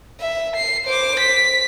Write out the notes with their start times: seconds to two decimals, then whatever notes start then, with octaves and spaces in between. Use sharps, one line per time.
0.20 E5
0.56 C7
0.85 C5 D6
1.19 B6